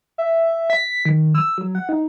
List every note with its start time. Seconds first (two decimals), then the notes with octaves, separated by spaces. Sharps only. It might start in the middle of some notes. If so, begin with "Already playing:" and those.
0.18 E5
0.70 B6
1.05 D#3
1.35 E6
1.58 F#3
1.75 F#5
1.89 D#4